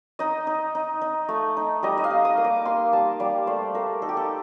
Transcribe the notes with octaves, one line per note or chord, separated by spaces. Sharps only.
D#4 D#5
D#4
D#4
D#4
A3
D#4
G3 D#5
D#5
F5
D#4
D#6
A#3
D6
A#3 C6
G3 A5
G3 D5
A3 C5
A3 A#4
D#4 A4
G4
A4